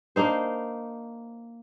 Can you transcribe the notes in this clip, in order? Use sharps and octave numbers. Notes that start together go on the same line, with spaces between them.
A#3 D4 D#4 C5